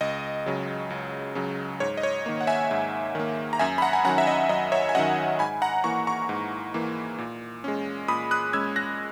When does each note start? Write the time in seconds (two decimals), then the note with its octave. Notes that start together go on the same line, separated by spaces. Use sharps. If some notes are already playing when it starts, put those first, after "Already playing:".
0.01 C#2 D#5
0.46 C#3 F#3
0.90 C#2
1.35 C#3 F#3
1.80 G#2 C#5
1.97 D#5
2.03 C#5
2.26 D#3 A#3
2.41 F#5
2.47 E5 G#5
2.71 G#2
3.15 D#3 A#3
3.53 A#5
3.59 F#2 E5 G#5
3.78 B5
3.82 F#5 A#5
3.93 G#5
4.05 D#3 F#3 C#4 F#5 A#5
4.18 E5
4.27 D#5 F#5
4.49 F#2 D#5
4.72 C#5 E5
4.89 G#5
4.95 D#3 F#3 C#4 D#5 F#5
5.39 G#2 G#5 B5
5.62 F#5 A#5
5.84 E3 A#3 A#5 C#6
6.07 A#5 C#6
6.29 G#2
6.74 E3 A#3
7.18 A#2
7.64 G#3 C#4
8.08 A#2 B5 D#6
8.31 D#6 F#6
8.53 G#3 C#4 E6 G#6
8.76 F#6 A#6